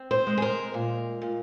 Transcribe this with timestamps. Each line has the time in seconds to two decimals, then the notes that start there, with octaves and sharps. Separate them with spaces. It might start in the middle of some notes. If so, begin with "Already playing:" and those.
Already playing: C4
0.11 C5
0.27 G#3
0.38 G#4
0.42 A#4
0.74 A#2
1.22 A#2